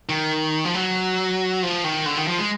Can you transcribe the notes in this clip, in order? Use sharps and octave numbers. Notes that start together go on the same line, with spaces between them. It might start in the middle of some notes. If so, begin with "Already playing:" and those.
D#3
F3
F#3
F3
D#3
D3
D#3
F3
G#3